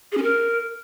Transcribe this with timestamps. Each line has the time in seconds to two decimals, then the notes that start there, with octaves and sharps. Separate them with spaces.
0.12 G#4
0.17 C#4
0.23 A#4